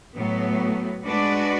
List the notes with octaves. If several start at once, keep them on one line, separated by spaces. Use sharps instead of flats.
A2 F#3 B3
G#3 D4 F#4 B4 D5